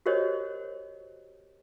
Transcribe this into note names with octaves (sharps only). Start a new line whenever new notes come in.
F#4 G4 A#4 C5 C#5 D#5